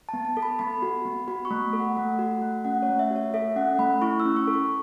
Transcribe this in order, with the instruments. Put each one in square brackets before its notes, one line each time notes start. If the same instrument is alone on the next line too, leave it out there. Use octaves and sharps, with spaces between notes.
[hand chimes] B3 A5
A5
A4
B5
B3 B5
F#4
B3
F#4 B5
C#6
A3
B5
A4
F#5
A3
F#4
A3
C#4 F#5
C#5
A3
E5
F#4
C#5
A4 E5
C#4 F#5
A3 B5
E4 C#6
E6
C#4
C#6
A4
C#6